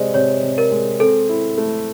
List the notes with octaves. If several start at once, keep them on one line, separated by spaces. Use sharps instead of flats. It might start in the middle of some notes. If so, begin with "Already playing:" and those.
Already playing: C3 G#3 C5 D5 D#5
C3 C#5
C3
A#4
G#3
C4 A4
E4
A3